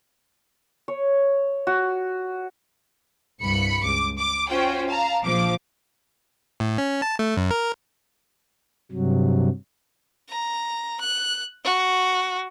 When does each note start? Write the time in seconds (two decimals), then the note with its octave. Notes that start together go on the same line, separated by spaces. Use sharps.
0.88 C#5
1.67 F#4
3.42 C2 G2 B5 C#7
3.84 C#2 D6
4.19 D6
4.48 C#4 F4 F#4 C5 G5
4.89 F5 A5 A#5
5.23 A#1 F3 D6
6.60 A2
6.78 C#4
7.02 A5
7.19 A3
7.37 F#2
7.51 A#4
8.92 G2 C3 F#3
10.30 A#5
11.01 F#6
11.65 F#4